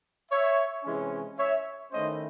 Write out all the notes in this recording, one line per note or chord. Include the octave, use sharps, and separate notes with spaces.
C#5 E5
C3 E3 G#3 C#4
C#5 E5
D#3 A3 C#4 E4 C5 D#5